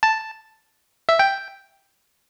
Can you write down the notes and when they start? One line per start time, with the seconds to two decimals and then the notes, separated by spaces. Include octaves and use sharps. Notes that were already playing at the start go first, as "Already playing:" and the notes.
0.03 A5
1.09 E5
1.19 G5